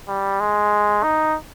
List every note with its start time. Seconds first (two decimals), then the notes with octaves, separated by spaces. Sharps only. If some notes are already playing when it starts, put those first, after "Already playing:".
0.08 G3
0.40 G#3
1.03 D#4